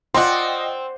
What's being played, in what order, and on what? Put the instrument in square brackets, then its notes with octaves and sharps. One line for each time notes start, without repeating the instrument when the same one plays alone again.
[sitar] C4 [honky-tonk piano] F4 D#5 G5 [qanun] D5 F#5 [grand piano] C6